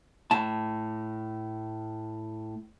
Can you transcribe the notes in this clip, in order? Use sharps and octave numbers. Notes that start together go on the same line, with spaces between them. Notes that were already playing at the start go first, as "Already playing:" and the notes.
A2 A5